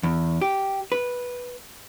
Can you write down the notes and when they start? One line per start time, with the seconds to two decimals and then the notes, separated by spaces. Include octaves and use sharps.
0.03 E2
0.41 G4
0.92 B4